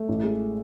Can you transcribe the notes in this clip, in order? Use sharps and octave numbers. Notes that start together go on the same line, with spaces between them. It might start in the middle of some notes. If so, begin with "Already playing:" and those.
Already playing: A3
A1
G#3